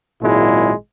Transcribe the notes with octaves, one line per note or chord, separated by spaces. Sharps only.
G#1 A#2 F#3 G#3 E4